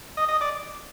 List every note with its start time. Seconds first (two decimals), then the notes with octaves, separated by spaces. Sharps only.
0.17 D#5
0.29 D#5
0.41 D5